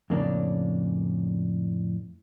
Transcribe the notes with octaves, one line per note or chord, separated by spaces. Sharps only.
F2 A2 C#3 A#3 C#4 D4